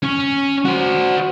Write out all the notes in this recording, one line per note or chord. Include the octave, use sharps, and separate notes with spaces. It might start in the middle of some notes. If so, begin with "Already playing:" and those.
C#4
F#4 C5